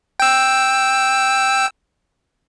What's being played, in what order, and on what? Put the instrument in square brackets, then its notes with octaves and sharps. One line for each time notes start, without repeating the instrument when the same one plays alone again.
[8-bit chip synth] G5 E6